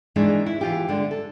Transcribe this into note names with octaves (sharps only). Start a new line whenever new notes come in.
D#3 E3 G#3 A#3 D4
E4
E3 F4 G4
D3 G#3 D4
A4